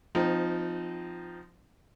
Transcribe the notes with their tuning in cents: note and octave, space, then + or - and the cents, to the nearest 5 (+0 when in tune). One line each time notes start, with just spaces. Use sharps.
F3 +0 C4 -25 D#4 +0